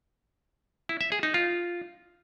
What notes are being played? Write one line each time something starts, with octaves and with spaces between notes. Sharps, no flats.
E4
E5
G#4
D#4
F4